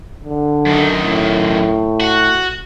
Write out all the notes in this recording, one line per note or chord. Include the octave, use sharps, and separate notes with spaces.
D3
F#2 D#3
A2
F#4